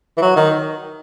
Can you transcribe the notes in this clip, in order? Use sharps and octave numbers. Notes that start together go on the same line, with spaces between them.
E3
F#3
D#3